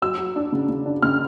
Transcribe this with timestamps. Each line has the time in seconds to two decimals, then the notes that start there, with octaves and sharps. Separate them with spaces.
0.02 F#3 E6
0.18 F#3
0.36 D4
0.52 C#3
0.68 C#3
0.86 D4
1.02 C#3 F6